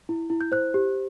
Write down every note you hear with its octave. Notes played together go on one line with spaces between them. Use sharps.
E4
E4
G6
C5 F#6
G4